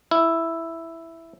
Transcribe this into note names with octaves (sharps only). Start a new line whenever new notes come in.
E4